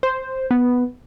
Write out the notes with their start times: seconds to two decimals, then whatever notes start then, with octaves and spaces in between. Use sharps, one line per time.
0.03 C5
0.51 B3